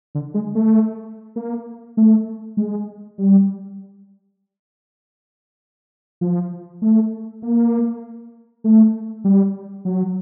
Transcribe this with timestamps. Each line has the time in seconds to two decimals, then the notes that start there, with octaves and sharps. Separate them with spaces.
0.15 D3
0.34 G#3
0.55 A3
1.36 A#3
1.97 A3
2.57 G#3
3.18 G3
6.21 F3
6.82 A3
7.42 A#3
8.64 A3
9.24 G3
9.85 F#3